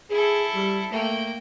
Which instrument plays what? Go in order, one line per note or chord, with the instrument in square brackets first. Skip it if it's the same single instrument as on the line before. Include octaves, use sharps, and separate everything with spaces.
[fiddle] E4 A4 [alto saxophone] G#4
[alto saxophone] G3
[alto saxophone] A3 [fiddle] A#3 G5